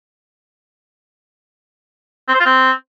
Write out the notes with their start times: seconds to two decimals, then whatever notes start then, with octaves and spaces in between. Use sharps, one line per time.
2.28 C4
2.34 C5
2.40 F4
2.46 C4